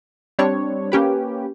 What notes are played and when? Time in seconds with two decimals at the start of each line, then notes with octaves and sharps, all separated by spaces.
0.39 G3 C4 D4 C#5
0.92 A#3 C#4 G4 B4